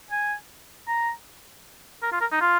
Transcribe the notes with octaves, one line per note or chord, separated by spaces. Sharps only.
G#5
A#5
A#4
F4
A#4
D#4
F4